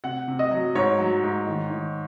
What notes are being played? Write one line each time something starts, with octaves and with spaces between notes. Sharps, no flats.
C3 F#5
C3
D#5
F#3
G#2 C#5
F#3
G#2
D#3
D#3